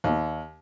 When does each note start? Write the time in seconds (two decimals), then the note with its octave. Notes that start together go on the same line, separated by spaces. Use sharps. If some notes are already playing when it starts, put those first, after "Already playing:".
0.04 D#2